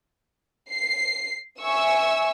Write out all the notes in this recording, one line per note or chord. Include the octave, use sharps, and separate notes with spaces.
C7
E5 G#5 C#6 E6